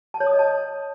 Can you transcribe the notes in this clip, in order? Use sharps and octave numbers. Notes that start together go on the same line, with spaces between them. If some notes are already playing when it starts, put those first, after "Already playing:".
A5
C#5
D#6
D#5
A5